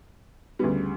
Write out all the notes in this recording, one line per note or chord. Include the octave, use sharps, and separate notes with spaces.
D2 C#3 G3 B3